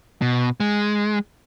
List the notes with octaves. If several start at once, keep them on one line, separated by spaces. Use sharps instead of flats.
B2
G#3